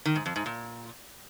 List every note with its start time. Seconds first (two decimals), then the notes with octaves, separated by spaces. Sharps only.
0.05 D#3
0.16 G#2
0.26 F2
0.36 G#2
0.46 A#2